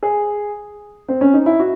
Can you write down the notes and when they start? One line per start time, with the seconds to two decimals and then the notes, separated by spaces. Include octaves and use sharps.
0.03 G#4
1.08 C4
1.21 C#4
1.34 D#4
1.46 E4
1.60 F#4